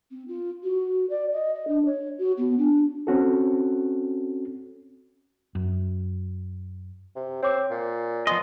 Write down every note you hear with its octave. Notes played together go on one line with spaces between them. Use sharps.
C4
F4
F#4
D5
D#5
D#5
D4
C#5
F#4
B3
D4
C4 C#4 F#4 A4
F#2
C3
C4 C#5 D6
A#2
F3 B3 D#5 G#5 C6